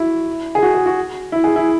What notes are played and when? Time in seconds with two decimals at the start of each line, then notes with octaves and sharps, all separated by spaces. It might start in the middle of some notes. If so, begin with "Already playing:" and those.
Already playing: E4 F#4
0.55 G#4
0.63 F#4
0.74 G#4
0.86 F#4
1.32 E4
1.44 G#4
1.56 E4